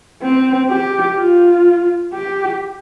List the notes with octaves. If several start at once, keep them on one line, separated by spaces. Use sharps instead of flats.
C4
G4
F4
G4